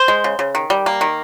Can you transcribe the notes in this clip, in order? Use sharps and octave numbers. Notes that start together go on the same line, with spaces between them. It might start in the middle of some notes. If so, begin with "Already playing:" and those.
Already playing: C5
G#3
C#3
C#3
D#3
G3
A#3
D#3